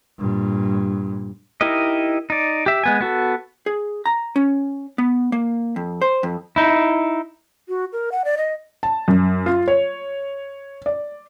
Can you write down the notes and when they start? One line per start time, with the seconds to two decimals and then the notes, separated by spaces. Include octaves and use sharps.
0.19 G2 A#2
1.61 D#4 E4 G4 A#4 D#5
2.30 D#4 D5
2.66 G4 E5
2.84 G#3 B3 G#5
3.01 B3 F#4 A4
3.66 G#4
4.06 A#5
4.36 C#4
4.98 B3
5.32 A#3
5.76 F2
6.01 C5
6.23 F2
6.56 D#4 E4
7.69 F#4
7.93 A#4
8.12 F#5
8.25 D5
8.37 D#5
8.83 A5
9.08 F#2
9.46 F4
9.68 C#5
10.86 D5